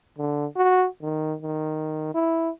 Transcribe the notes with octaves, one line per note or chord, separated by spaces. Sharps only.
D3
F#4
D#3
D#3
E4